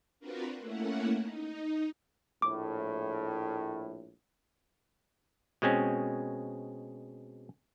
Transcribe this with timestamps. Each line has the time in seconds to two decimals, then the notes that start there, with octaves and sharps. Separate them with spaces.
0.20 C4 D4 F4 F#4 A#4 B4
0.57 A3 A#3 C#4 E4 F#5
1.19 D#4
2.42 A#1 A2 D6
5.62 B2 G#3 C4 C#4